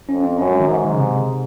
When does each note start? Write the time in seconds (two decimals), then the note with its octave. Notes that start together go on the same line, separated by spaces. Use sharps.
0.09 F2 C#4
0.23 C4
0.38 F#2 C#4
0.49 G#3
0.60 D#3
0.68 G#2 F#3
0.84 D#3
0.94 C#3
0.99 C3